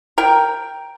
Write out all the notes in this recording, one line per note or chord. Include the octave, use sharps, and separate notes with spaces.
A#4 G5